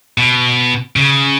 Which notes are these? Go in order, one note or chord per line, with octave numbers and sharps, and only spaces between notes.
B2
C#3